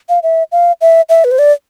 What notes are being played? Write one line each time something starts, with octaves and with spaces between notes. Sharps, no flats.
F5
E5
F5
E5
E5
B4
C5
D5